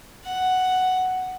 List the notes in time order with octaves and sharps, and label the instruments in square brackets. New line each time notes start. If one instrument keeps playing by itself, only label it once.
[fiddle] F#5